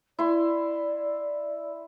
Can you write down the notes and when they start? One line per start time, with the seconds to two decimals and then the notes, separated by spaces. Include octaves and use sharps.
0.19 E4 D5 C6